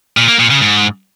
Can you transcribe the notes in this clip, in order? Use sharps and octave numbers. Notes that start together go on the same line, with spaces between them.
A#2
A#3
A#2
C#3
G#2